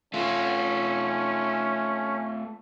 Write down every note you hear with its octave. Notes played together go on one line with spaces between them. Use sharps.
A3 C#4 F4